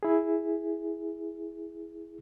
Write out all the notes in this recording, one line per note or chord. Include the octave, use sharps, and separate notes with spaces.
E4 G#4